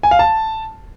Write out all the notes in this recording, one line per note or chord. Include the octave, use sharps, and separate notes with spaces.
G#5
F5
A5